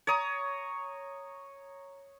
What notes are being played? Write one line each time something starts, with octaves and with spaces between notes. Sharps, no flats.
C#5 A#5 D#6